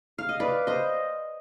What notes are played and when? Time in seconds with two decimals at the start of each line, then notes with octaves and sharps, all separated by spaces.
0.18 F5
0.29 D#5
0.40 B4 D5
0.67 C5 D#5